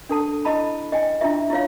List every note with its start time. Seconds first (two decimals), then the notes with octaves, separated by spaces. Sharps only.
0.09 D4 A4 A5
0.45 E4 D#5 A5 B5
0.92 D#5 G5 G#5
1.21 D4 E4 F4 E5
1.50 E4 F4 C#5 F5